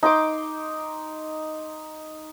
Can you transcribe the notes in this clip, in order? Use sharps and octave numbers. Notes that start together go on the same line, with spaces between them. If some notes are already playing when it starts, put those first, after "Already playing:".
D#4 C6 D6